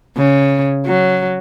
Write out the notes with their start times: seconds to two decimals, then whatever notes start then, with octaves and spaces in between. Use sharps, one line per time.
0.18 C#3
0.86 F#3